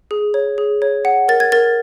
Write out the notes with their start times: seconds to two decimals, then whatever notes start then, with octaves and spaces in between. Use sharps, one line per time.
0.11 G#4
0.34 C#5
0.58 G#4
0.82 C#5
1.05 F#5
1.28 A#4 A6
1.40 G#6
1.52 A#4 A6